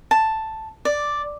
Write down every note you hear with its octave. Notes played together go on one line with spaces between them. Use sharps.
A5
D5